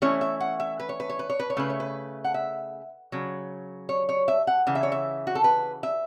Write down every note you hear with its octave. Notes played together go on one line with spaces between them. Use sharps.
E3 A3 C#4 E4 C#5
E5
F#5
E5
B4
C#5
B4
C#5
B4
C#5
B4
C#5
C#3 A3 E4 B4
C#5
B4
F#5
E5
C#3 F#3
C#5
C#5
E5
F#5
C#3 E3
E5
C#5
E5
F#4
A4
B4
E5